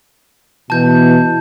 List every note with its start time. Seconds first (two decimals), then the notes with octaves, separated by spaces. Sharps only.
0.70 B2 E3 A5 G6